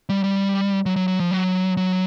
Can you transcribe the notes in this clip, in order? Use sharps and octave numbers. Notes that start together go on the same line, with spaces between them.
G3
G3
F#3
F#3
F#3
F3
F#3
F#3